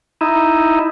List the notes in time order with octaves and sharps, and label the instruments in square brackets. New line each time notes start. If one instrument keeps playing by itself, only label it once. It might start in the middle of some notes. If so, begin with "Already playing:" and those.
[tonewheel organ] D#4 E4